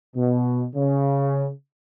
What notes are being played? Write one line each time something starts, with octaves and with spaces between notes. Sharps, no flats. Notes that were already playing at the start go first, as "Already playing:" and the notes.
B2
C#3